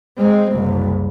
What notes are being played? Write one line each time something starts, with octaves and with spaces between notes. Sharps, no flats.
G#3 C4
F#1 C2